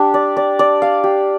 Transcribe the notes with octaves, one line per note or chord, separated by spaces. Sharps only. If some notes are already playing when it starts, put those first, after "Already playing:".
Already playing: D4 G4
D5
D5
D5
F5
G4